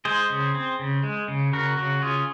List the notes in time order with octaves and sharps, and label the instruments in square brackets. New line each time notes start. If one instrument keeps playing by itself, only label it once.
[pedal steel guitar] G#3 G#4 C5
C#3
C4
C#3
G#3
C#3
C#3 F#4 A#4
C#3 F#4
C#4 F4 G#4